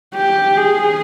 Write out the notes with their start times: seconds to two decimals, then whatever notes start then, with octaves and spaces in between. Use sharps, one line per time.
0.15 G4
0.57 G#4